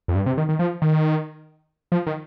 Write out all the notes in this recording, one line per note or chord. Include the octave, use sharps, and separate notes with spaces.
F2
G2
C3
D#3
D#3
F3
D#3
F3
D#3